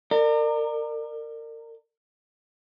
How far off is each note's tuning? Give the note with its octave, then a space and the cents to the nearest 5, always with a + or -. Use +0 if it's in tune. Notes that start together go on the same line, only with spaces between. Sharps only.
A#4 -30 D5 +30